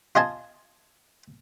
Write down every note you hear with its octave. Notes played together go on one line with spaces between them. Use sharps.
F4 D#5 G#5 A5